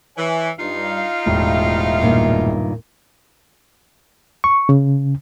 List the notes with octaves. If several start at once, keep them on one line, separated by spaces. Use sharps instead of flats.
E3 C#5 G#5
G2 D#4 F4 F5
E1 C2 A2 F3 E5
G2 A#2 D#3
C#6
C#3